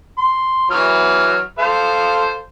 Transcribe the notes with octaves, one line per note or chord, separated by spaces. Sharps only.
C6
E3 F#3 F6
A4 C5 F5